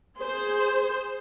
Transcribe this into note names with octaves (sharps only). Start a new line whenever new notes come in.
G#4 C5